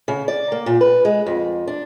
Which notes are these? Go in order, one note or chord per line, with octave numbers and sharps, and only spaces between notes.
C#3
D5
A#3
A#2
B4
G#3
F2
D4